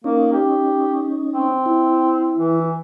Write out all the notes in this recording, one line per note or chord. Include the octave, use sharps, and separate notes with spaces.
A#3 C#4 D#4
G4
C4
E4
E3